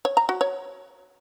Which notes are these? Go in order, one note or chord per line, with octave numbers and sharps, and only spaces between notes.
C#5
A#5
F#4
C#5